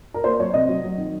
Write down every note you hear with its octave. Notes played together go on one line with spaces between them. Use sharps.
A#4
A#3 C5
F#3 C#5
C3 D#5
F#3
F#3
D#3